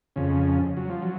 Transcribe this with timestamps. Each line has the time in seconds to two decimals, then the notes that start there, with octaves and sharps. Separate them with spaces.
0.16 F2 C#3
0.77 F#3
0.90 F3
1.02 F#3